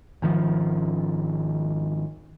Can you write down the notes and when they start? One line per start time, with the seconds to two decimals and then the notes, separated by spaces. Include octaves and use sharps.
0.22 G#1 D#3 F3